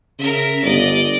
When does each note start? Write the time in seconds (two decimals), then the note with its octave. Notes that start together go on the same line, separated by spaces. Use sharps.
0.19 C#3 A#4 E5
0.62 G1 D5 D#5